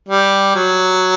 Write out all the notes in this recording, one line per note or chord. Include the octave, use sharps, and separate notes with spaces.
G3
F#3